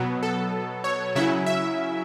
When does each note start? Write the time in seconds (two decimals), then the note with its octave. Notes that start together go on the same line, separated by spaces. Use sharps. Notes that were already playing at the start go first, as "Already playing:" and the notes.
Already playing: B2 F#3 B3
0.23 A4
0.84 C#5
1.15 C#3 F#3 C#4 E4 E5
1.46 E5